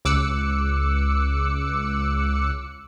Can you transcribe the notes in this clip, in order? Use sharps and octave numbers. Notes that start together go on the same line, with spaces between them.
C#2 D6 E6 F#6 C#7